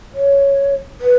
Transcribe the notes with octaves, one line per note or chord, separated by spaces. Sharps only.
C#5
B4